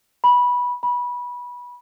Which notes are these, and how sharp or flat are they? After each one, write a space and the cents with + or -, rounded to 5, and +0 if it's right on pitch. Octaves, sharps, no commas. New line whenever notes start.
B5 -15
B5 -20